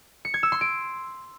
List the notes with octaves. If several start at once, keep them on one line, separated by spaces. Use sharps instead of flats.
C#7
G#6
E6
C6
D7